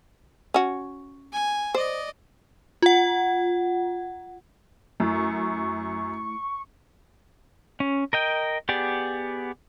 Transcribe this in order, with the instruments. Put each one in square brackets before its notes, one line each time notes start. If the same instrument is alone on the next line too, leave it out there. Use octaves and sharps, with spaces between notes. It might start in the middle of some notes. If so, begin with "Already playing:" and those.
[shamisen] C#4 F#4
[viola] G#5
[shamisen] C5 [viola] D5 D#5
[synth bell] F4 F#5
[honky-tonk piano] F#2 [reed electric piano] A3 E4 [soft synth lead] C#6
[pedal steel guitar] C#4
A#4 D#5 G5
B3 G4 G#4 D5